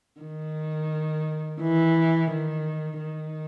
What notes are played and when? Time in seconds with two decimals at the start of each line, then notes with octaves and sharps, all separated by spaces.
0.21 D#3
1.61 E3
2.31 D#3
3.00 D#3